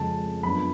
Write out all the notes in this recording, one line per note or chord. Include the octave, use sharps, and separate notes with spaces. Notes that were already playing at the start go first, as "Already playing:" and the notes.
Already playing: F2 C#3 G#3 C#4 A5
F#2 F3 B3 D4 B5